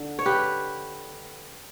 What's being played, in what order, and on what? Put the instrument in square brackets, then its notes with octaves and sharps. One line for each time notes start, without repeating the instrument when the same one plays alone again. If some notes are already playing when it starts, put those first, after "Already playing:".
Already playing: [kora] D3
C#5
G4 B4